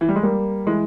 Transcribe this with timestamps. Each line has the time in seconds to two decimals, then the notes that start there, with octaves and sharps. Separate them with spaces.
0.01 E3
0.09 G3
0.16 G#3
0.23 G3 A#3
0.67 E3 G#3